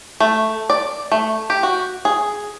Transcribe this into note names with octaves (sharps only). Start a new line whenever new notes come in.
A3
D5
A3
G4
F#4
G#4